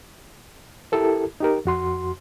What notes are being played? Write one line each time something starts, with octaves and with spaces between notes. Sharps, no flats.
E4 G4 A4 A#4
D#4 G4 A#4
F2 F#4 C6